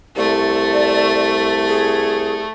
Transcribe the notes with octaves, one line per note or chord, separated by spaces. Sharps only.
C2 A3 D5
G#4